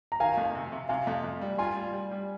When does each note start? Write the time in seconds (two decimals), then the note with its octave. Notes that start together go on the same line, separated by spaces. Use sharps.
0.12 A#5
0.20 D#3 F5 G#5
0.37 F2
0.55 C3
0.72 C3
0.89 C3 F5 G#5
1.07 F2
1.24 F2
1.41 G3
1.58 F4 G#5 C6
1.76 G3
1.93 G3
2.11 G3